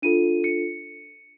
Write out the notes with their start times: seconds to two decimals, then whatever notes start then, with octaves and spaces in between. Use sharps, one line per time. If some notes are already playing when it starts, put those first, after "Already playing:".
0.02 D4 F4 A4 D#7
0.44 C#7